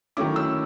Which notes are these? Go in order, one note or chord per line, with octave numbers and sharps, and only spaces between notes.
D#3 F#3 A3 C#4 E4 D6
E6